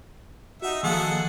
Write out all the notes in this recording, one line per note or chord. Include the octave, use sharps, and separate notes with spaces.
D#4 F#4 E5 F#5
D#3 F3 A#3 G#4 A4 F#5